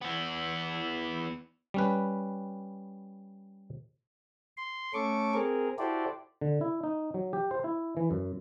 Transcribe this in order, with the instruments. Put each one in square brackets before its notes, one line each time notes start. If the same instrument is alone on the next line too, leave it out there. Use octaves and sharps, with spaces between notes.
[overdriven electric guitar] E3 B3
[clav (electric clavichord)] G3 C#4 B4
[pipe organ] C6
A3 C#4 A4 C#6 D6
C4 G#4 A#4
E4 F#4 G4 A4 C5 D5
[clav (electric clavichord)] D3
E4
D#4
F#3
G4
C5
E4
E3
F#2